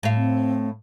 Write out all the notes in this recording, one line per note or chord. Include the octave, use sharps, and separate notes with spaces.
A2 F5
C4